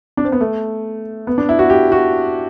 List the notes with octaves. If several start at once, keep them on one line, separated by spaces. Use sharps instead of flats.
D4
C4
B3
A3
B3
D4
E4
F#4
G4
F#4